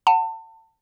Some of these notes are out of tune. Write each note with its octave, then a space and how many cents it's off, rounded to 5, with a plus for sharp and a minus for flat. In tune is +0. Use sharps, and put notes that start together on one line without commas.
F#5 +0 A5 +30